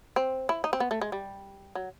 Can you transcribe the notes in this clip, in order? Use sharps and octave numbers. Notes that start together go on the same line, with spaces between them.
C4
E4
D#4
C4
B3
A3
G#3
G3
F#3